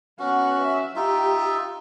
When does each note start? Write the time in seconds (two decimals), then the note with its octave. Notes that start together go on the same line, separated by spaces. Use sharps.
0.19 B3 C#4 F#4 F#5
0.62 E5
0.96 D#4 F4 G4 E5